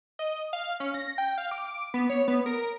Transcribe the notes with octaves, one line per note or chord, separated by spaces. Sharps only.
D#5
F5
C#4
A#6
G5
F5
D6
B3
C#5
B3
A#4